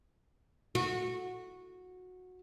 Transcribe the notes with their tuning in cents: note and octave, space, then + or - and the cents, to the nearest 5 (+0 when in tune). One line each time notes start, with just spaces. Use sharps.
F#4 -15